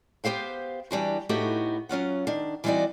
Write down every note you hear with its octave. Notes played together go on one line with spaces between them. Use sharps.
B3 G4 C5 F5 G5
E3 G3 D4 F#4
A2 A3 B3 D#4 F#4 G4
F#3 C#4 F4 F#5
D#3 D4
E3 G3 C4 D#4 F#4 D5